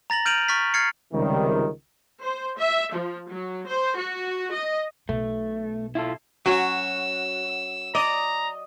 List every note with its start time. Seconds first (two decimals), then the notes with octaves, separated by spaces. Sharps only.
0.10 A#5 A6 A#6 F#7
0.26 F6 G6 D7 D#7 F7 F#7
0.48 C#6 F6 A6 B6
0.74 F6 G#6 A6 C7 C#7
1.14 C#2 C3 D#3 G3
2.22 C5
2.58 E5
2.94 F3
3.29 F#3
3.66 C5
3.97 F#4
4.52 D#5
5.09 B1 B2 A3
5.95 E4 F4 A4
6.46 F#3 C#4 F#4 E6
7.95 D5 D#5 A#5